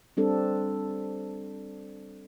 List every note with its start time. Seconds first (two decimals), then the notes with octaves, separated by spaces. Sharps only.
0.17 G3 C4 D4 A4